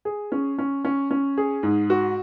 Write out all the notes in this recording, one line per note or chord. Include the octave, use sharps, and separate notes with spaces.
G#4
C#4
C#4
C#4
C#4
G#4
G#2
F#4